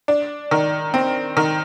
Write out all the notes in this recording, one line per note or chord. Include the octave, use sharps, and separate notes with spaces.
D4
D#3
C4
D#3